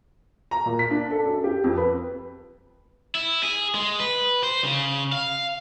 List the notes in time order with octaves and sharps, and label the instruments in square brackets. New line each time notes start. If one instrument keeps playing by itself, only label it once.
[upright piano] A#5
A#2
B6
D4
A4
F#2
G4
F2
B4
[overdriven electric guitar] E4
G#4
G#3
B4
C5
C#3
F5